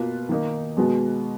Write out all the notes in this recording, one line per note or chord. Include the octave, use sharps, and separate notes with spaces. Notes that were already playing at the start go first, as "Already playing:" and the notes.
Already playing: B2 A#3 F4 B4
D#3 A#3 D#4
B2 G#3 B3 F#4